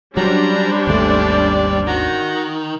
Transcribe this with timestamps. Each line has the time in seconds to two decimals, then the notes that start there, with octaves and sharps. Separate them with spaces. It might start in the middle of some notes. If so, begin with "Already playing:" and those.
0.17 F#3 G3 C#4 D4 C5 A#5
0.87 G#1 D#2 A3 D5
1.87 D#3 F#4 A#5